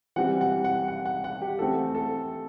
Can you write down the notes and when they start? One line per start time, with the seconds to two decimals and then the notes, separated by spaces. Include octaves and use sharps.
0.16 E3 G3 C4 F#5
0.41 F#5
0.64 F#5
0.88 F#5
1.05 F#5
1.24 F#5
1.42 G4
1.59 E3 A3 C4 A4
1.95 A4